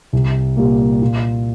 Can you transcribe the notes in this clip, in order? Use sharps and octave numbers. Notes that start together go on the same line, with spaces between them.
C2
A#2 G3 A#3
A#2